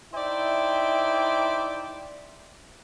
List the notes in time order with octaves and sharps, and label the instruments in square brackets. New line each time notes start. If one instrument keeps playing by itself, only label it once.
[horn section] D#4 E4 C5 D5 E5 G5